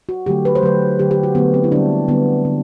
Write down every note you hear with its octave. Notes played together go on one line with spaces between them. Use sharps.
F#4
D3 F#3 A3 G4
B4
C5
D3 F#3 A3 B4
D3 F#3 A3 G4
G4
F#4
D3 F#3 A3 B3
C4
E4
D3 G3 D4
D3 G3 B3
D3